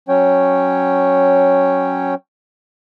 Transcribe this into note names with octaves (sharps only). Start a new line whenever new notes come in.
F#3 C#4 C#5 G5